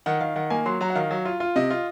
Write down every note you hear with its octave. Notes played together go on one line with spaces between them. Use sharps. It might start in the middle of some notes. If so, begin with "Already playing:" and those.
D#3 F#5
D#3 F5
D#3 F#5
A#3 G#5
F#3 C6
F#3 A#5
F#5
D#3 F5
F#3
F4
F4
C3 D#5
F4